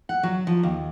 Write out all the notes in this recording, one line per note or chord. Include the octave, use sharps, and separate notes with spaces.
F#5
F#3
F3
D#2